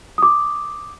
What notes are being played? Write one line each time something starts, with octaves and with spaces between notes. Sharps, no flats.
D6 D#6